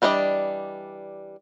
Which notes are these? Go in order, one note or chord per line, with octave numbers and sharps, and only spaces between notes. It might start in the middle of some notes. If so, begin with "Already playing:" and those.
E3 G3 D4 D5 D#5